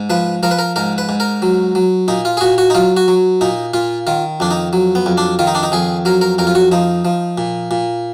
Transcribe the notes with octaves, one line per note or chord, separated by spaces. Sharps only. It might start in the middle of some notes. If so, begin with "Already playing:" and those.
Already playing: G#2
F3 B4
F3 A#4
B4
A#4
G#2 A#4
B4
G#2
A#4
F#3
F#3
A#2 D#4
F4
G#4
A#2 F#4
F#4
D#4
F#3 F4
F#4
F#3
A#2 D#4
A#2 F4
D#3 F4
F2 D4
D#4
F#3
B3
F2
D4
D#3 F4
D#4
D4
D#4
F2 G#4
F#3 A#4
A#4
F2 A#4
F4
F#4
F3 D#4
F3
A#2
A#2